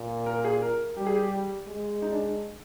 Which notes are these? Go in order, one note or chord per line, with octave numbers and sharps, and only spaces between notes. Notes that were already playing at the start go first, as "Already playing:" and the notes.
Already playing: A#2
A#4
G#4
A#4
G3 G4
G#4
G4
G#3
D#4
D4